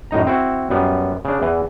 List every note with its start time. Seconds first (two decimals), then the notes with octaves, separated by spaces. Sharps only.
0.11 F#2 A2 D#4 A#5
0.27 C4 E4 F#4
0.70 F#2 G3 B3
1.25 C#3 D4
1.42 E2 E3